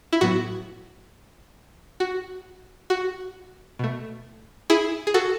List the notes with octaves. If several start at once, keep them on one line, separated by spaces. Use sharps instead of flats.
E4
A2 F#3 B3 F#4
F#4
F#4
B2 A3
E4 G#4
G#4
F#4 A4